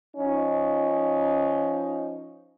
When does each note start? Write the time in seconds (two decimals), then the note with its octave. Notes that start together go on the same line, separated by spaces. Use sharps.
0.16 F3 C#4 D#4